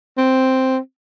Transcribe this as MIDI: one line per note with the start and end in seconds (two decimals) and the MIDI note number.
0.18 0.78 60